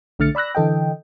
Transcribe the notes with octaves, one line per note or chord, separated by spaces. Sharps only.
B1 D3 A3 F6 A6 C#7
D5 B5 E6 F#6 A#6
D3 E3 A4 D#5 G5